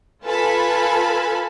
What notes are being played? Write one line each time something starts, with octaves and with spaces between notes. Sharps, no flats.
F4 A4 B4 G#5 A5 B5